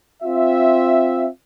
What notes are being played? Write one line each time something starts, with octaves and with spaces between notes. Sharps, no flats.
C4 F4 E5